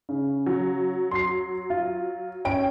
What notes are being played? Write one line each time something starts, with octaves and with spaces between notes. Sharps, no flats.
C#3
F#3
C6 C7
F4
C#4 G5 D7